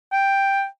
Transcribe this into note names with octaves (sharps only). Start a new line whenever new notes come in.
G5